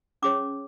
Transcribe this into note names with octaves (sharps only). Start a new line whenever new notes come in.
C#4 G#4 C#5 D6